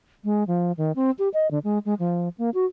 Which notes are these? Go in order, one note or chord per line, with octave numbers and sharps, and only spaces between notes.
G#3
F3
D#3
C4
G4
D#5
D3
G#3
G#3
F3
A#3
F#4